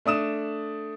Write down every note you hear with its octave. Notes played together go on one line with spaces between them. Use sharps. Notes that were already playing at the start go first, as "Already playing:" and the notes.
A3 D4 D#6 E7